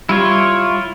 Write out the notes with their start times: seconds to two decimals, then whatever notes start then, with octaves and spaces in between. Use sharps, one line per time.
0.09 G3 E4 F4 C#5